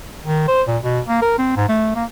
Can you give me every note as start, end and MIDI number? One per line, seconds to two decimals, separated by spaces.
0.24 0.46 51
0.48 0.63 72
0.67 0.78 46
0.83 1.00 47
1.08 1.22 58
1.22 1.33 70
1.38 1.53 60
1.56 1.65 44
1.69 1.91 57
1.95 2.04 58